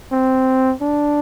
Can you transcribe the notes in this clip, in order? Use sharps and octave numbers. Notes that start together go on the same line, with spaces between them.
C4
D4